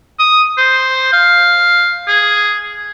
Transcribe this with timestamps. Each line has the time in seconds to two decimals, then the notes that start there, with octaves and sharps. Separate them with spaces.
0.19 D#6
0.58 C5
1.13 F5
2.08 G#4